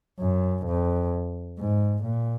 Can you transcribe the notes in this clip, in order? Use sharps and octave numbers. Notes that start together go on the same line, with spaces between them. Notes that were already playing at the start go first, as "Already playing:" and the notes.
F#2
F2
G#2
A#2